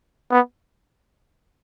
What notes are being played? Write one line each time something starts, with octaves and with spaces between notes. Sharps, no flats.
B3